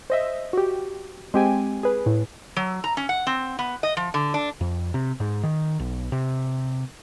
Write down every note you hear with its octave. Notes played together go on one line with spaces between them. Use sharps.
C5 D#5 E5
F#4 G4
G#3 C4 G4 G5 G#5
G#4 B4
A2
F#3
A#5
C#4
F#5
C4
B3
D#5
F3
D3
D4
F2
C3
G#2
D#3
B1
C3